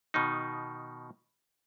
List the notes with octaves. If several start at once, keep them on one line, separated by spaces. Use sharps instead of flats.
B2 D#3 D#4